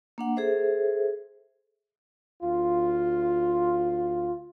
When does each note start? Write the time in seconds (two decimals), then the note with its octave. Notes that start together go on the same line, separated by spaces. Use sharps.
0.18 A#3 D4 F#5
0.37 G#4 A4 C5 E5
2.42 D2 F4